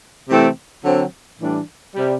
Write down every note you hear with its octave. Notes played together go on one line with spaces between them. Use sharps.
C3 E3 A3 C4 E4
D3 F#3 C4
A2 E3 G3 D4
C3 G3